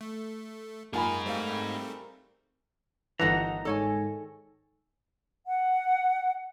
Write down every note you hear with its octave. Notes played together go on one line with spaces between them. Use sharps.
A3
F#2 A#3 D#4 F4 G#4 A#4 G#5 B5
G3 A3 C4 C5 F5
G1 D#3 E3 D#4 F#5 A5 A#5
G#2 A4 C#5 G#5
F#5